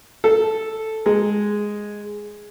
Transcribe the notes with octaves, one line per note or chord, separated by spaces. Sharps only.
A4
G#3